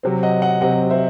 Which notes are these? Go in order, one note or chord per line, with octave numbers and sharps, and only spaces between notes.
C3 F#3 C4
D#5 F#5
D#5 F#5
C3 F#3 C4 D#5 F#5
C5 E5